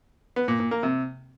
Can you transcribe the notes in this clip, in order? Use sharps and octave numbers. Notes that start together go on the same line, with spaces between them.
B3
A#2
A#2
A#3
C3